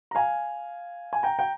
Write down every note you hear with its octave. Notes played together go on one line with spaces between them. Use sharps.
A#5
F5 G#5
G#5
G5 A#5
G5